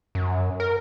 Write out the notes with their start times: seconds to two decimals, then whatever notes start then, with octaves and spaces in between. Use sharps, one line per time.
0.15 F#2
0.60 A#4